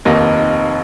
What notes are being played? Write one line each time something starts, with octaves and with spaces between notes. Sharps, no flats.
F1 D#2 D#3 A#3 D#4